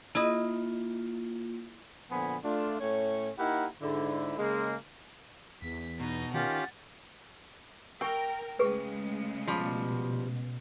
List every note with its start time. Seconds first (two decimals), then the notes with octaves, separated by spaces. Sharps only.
0.15 A#3 E4 F4 D#5
2.11 A#2 D3 F3 B3 G#5 B5
2.44 A3 D4 F4
2.80 A2 A3 C#4 C#5
3.38 A#3 D#4 E4 G4 A#4 F#5
3.82 G#2 D3 E4
4.38 C#3 G#3 A#3
5.62 E2 B6
6.00 B2 D#4
6.34 D#3 C#4 F4 G4 F#5 A6
8.01 G4 A#4 G5 E6
8.59 C#3 G#3 A3 G4 G#4 B4
9.48 B2 F3 G3